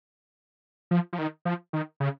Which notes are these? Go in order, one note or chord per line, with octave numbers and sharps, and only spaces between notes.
F3
F3
D#3
F3
D#3
C#3